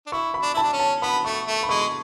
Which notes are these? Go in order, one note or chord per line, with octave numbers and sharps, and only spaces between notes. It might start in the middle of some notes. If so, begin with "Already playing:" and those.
D4
E4 C#6
B5
D4
E4 A5
D4
C#4
A5
B3 B5
A3 C#6
A3
B5
G#3 C#6